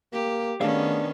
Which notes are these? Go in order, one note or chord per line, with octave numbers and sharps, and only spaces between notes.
A#3 G4
D#3 A3 B3 C#4 D4 G#4 F5